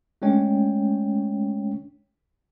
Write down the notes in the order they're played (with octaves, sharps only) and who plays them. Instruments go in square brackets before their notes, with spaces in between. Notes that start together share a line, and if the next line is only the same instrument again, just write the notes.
[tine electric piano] G#3 A3 C#4 D4 C#5 G5